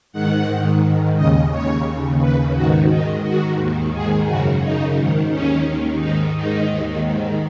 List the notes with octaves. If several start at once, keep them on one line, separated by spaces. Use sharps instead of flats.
G#2 D#3 F#5
G#2 D#3
G#2 D#3
D#2 C#3 D#5
D#2 C#3 C#5
D#2 C#3
D#2 C#3 B4
G#2 D#3 F#4
G#2 D#3 D#4
G#2 D#3 F#4
D#2 D#3
G#2 D#3 G#4
F#2 C#3 F#4
F#2 C#3 D#4
G#2 D#3
D#2 D#3 C#4
D#2 D#3
G#2 D#3 D#4
G#2 D#3 D#4
D#2 D#3
G#2 D#3